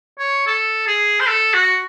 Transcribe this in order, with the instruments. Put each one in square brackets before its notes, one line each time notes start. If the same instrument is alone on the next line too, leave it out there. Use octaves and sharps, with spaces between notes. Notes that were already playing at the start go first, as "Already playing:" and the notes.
[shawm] C#5
A4
G#4
C5
A4
F#4